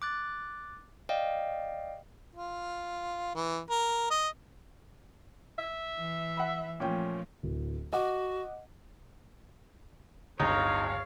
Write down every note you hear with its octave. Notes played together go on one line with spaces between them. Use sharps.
D6 F#6 A6
D5 D#5 F5 G5
F4
E3
A#4
D#5
E5
E3
F#5 B5
A#2 F3 A3 C#4 G5
D1
F#4 D#5 F#5 D6
D1 G1 D#4 C#5 F5